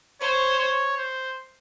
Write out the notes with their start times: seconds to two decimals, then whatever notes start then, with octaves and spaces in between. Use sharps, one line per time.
0.20 C5 C#5
0.59 C#5
0.97 C5